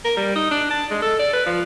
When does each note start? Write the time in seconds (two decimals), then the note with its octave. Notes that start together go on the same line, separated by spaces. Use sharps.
0.05 A#4
0.17 G3
0.36 D#4
0.51 D4
0.71 A5
0.91 G#3
1.02 A4
1.19 D5
1.33 B4
1.46 F3